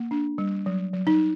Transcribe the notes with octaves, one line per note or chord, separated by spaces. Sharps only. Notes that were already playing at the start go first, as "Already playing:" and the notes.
Already playing: A#3
D4
G3
F#3
F#3
D#4